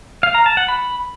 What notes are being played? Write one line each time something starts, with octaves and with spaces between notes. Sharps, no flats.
F5
A#5
A5
F#5
B5